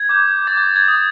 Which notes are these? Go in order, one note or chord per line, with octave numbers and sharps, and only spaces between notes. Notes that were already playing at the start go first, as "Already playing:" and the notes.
Already playing: G#6
D6 G6
D6 G6 A6
G6
G#6
D#6 G6